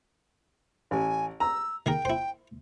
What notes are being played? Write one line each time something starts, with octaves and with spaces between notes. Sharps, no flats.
A1 G#5
A#5 E6
D#3 G#4 A#4 G5
E4 C5